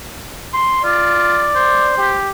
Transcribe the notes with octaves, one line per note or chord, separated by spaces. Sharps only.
C6
F4 D5
C5
G4